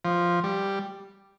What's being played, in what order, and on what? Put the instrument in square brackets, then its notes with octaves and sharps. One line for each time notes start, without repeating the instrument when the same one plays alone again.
[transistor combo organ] F3
G3